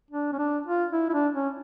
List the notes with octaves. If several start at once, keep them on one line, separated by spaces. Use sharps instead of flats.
D4
C#4
D4
F4
E4
E4
D4
C#4